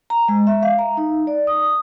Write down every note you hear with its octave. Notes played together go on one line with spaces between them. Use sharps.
A#5
G#3
E5
F5
A#5
D#4
D5
D#6